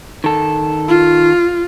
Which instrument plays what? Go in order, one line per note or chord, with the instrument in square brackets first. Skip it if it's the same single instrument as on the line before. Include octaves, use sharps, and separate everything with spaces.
[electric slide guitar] D#3 A4
[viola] F4